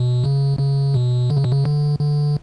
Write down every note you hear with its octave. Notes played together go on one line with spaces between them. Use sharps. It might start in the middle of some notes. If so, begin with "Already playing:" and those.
Already playing: B2
C#3
C#3
B2
D3
C#3
B2
C#3
D3
D3